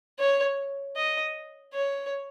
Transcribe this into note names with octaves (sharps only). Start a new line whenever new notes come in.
C#5
D#5
C#5